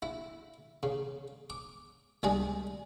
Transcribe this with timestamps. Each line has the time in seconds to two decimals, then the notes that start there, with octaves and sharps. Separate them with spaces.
0.02 E4
0.83 C#3
1.50 D6
2.23 C#2 G3 G#3 G#4 D#6